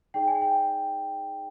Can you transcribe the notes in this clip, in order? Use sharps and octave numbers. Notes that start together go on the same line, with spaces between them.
D#4 G#4 D5 G5
G#5
G5